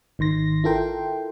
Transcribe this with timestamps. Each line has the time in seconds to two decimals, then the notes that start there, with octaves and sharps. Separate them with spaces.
0.19 G#1 D#3 C6 A#6
0.64 E4 F4 A4 A#4 G5 C6